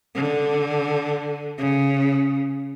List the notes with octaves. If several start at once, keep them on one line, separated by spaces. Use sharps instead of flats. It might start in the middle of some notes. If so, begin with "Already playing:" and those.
D3
C#3